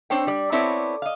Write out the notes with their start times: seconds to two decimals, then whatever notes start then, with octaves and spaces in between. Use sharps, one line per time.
0.10 C4 D4 C5 C#5 G5
0.27 G3 D5
0.52 B3 C4 E4 A4 C#5 D5
1.02 D#5 F5